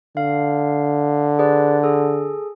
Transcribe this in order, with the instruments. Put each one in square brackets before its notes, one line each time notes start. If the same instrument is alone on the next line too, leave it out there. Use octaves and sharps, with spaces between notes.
[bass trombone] D3 [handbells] F5
[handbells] G#4 B4 D5
G#4 A4